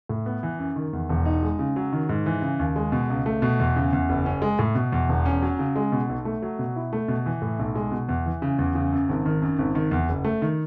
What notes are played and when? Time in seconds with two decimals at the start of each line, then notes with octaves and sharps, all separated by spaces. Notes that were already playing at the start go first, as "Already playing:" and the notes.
0.09 A2
0.26 B3
0.43 E3
0.59 F#2
0.76 D#3
0.93 E2
1.09 E1
1.25 D#4
1.43 G#3
1.59 C#3
1.76 F#3
1.92 D#3
2.09 G#2
2.26 E3
2.42 C#3
2.59 D#2
2.76 G#3
2.92 B2
3.10 C#2
3.26 A3
3.42 B2
3.60 E2
3.76 C#3
3.93 E2
4.09 F#1
4.26 C#4
4.42 G#3
4.59 A2
4.75 B2
4.92 E2
5.09 E1
5.26 C#4
5.43 F#3
5.59 C#3
5.76 G#3
5.92 B2
6.09 B1
6.25 A3
6.42 F#3
6.59 B2
6.76 E4
6.93 A3
7.08 B2
7.26 E3
7.42 A2
7.59 B1
7.75 G#3
7.91 B2
8.09 E2
8.26 E3
8.42 C#3
8.59 E2
8.75 C#3
8.93 F#2
9.09 G#1
9.26 D#3
9.42 F#2
9.59 G#1
9.75 D#3
9.91 E2
10.09 F#1
10.25 A3
10.42 D#3